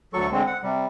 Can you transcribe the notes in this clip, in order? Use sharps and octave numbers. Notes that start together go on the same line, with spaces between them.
D2 F#3 A4 C#6
D3 G#3 C4
F#5
C3 G3